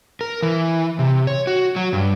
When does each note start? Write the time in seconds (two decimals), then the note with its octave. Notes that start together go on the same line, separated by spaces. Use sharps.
0.21 A#4
0.43 E3
0.99 C3
1.27 C#5
1.47 F#4
1.76 F#3
1.93 G2